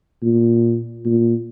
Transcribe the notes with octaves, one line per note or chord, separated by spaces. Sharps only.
A#2
A#2